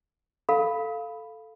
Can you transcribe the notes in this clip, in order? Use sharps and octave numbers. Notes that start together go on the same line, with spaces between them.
A4 F5 B5